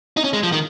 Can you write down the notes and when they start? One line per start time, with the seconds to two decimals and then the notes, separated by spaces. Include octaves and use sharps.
0.17 D#4
0.24 C#4
0.33 G#3
0.43 F3
0.53 D#3